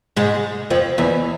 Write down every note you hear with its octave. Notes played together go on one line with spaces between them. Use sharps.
G#2 G#3
F2 F3
E2 E3